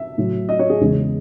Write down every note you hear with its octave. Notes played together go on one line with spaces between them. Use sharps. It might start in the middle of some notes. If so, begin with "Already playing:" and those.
Already playing: E5
A2 F#3
D#5
C#5
G#4
E2 C#3 G#3